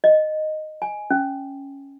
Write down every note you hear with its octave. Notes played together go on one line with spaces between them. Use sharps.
D#5
G#5
C#4